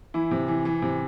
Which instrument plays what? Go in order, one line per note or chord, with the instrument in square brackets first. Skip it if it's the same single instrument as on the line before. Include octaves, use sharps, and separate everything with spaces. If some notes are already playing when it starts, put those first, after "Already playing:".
[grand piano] E3 E4
C3
E3
E3
C3